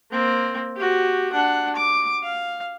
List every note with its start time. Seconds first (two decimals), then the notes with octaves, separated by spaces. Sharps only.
0.11 A#3 C4
0.76 F#4 G4
1.33 D4 F#5
1.76 D6
2.23 F5